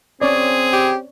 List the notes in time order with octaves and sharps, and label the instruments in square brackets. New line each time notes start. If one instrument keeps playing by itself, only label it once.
[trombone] C4 [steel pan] C#4 C#5 D5 [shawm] G#4
[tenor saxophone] G4